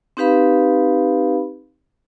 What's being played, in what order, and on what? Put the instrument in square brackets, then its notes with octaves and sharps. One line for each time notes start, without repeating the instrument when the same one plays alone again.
[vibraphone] C4 D#4 G4 B4 F5 B5